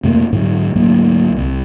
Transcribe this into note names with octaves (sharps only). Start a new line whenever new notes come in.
F2 C3 A3 A#3
G#2 D3 F#3
D2 G#2 F#3 A#3
C2